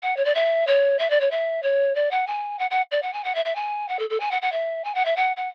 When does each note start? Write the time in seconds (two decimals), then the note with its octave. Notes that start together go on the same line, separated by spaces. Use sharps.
0.02 F#5
0.17 C#5
0.25 D5
0.35 E5
0.67 C#5
0.99 E5
1.10 D5
1.20 C#5
1.31 E5
1.63 C#5
1.95 D5
2.11 F#5
2.27 G#5
2.59 F#5
2.71 F#5
2.91 D5
3.02 F#5
3.13 G#5
3.24 F#5
3.35 E5
3.45 E5
3.55 G#5
3.88 F#5
3.99 A4
4.10 A4
4.20 G#5
4.31 F#5
4.42 F#5
4.52 E5
4.84 G#5
4.95 F#5
5.05 E5
5.16 F#5
5.37 F#5